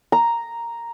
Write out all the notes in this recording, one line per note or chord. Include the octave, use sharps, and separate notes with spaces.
A#5